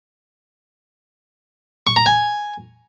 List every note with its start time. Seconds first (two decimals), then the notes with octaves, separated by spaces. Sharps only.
1.87 C#6
1.96 A#5
2.06 G#5